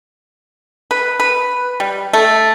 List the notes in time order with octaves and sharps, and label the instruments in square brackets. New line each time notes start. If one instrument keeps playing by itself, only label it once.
[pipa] B4
B4
G3
A3